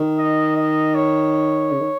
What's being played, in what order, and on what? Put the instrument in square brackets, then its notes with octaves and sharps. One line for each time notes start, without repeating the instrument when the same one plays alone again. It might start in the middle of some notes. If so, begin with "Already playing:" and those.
Already playing: [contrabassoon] D#3
[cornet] D#5
D#5
C#5
[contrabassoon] C#3
D#3